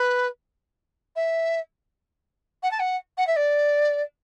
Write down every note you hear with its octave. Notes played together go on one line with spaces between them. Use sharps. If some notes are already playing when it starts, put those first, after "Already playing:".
Already playing: B4
E5
F#5
A5
F#5
F#5
E5
D5